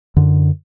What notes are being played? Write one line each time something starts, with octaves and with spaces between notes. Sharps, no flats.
F#2 D3